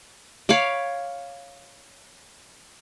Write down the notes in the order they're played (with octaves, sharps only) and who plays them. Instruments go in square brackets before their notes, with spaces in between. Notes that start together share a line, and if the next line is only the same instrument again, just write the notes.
[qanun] C#5 F5 B5 D6